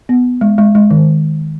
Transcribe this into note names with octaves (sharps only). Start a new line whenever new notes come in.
B3
G#3
G#3
G#3
D#3